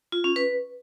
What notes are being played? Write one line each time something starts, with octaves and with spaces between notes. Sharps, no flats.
F4
C#4
B4